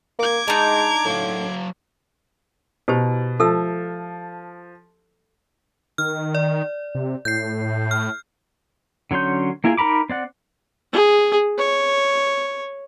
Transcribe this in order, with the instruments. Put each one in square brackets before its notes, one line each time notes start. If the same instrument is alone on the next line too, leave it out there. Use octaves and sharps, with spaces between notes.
[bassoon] A#3 [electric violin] D6 G#6
[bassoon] G#3 [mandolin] D4 D#4 [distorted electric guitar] A#5
[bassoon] A2 [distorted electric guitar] F#3 F5
[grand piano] B2 [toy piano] E4 G4 C5
[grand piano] F3 A5 [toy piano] A4 E5 E6
[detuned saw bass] D#3 [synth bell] F6
[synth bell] D5
[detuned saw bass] C3
[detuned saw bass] A2 [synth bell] G6 C7
[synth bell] F6
[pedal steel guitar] D3 F#3 C#4 C6 G6
A#3 E4 F4 G#4 A#4
D#4 A#4 A#5 B5 D6
C4 D5 F#5
[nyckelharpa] G#4
C#5